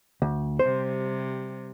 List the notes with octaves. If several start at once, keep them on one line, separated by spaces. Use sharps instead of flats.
D2
C3 G3 C5